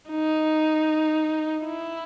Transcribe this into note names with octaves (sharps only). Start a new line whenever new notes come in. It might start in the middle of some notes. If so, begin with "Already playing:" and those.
D#4
E4